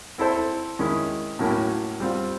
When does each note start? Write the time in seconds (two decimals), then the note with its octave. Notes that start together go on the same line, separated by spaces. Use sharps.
0.18 C4 E4 A4 C5
0.79 D#3 G#3 C#4 E4
1.39 A2 F#3 A#3 C#4 E4
2.00 G3 C4 F4